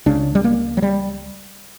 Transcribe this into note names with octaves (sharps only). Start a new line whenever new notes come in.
C#2 C#3 D4
G3
A#3
F#3
G3